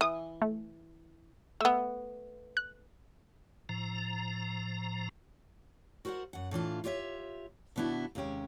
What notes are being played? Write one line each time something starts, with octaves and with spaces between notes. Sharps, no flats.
E3 D#6
A3
A3 B3 E6
F#6
A2 F3 A#5
F#4 A#4 C5 D5 F#5
F#2 F#5
A2 E3 D4 F4
F4 G4 C#5 D5 E5
B2 D#3 B3 D4 E4 F#4
D#2 C3 G#3 C#4 G5